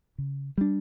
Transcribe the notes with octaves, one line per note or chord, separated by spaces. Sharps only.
C#3
G3 D4